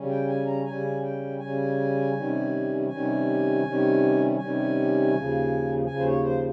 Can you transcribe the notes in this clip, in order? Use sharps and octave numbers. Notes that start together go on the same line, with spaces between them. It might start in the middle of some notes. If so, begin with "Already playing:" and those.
Already playing: C#3 G3 C#4
G5
G#5
A#5
C#3 G3 C#4 G#5
G5
C#3 G3 C#4 G#5
C3 D#3 G3 C#4
C3 D#3 G3 C#4 G#5
C3 D#3 G3 C#4
C3 D#3 G3 C#4 G#5
D#2 C#3 F3
D#2 C#3 F3 G#5
C5
C#5
C5